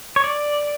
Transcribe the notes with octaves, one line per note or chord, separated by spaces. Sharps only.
C#5
D5